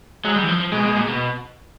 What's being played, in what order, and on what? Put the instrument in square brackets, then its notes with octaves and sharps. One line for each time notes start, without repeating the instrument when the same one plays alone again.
[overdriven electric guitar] F#3 [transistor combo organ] G#3
[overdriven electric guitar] G3
E3
F3
F3
[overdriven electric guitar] B2 [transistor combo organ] G#3
[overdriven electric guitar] B2
A#2
B2